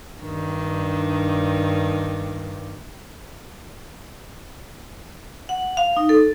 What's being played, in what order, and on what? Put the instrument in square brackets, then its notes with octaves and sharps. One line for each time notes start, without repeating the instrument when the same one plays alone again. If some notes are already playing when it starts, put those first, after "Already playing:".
[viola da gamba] G2 D#3 D4
[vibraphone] F#5
F5
D#4
A4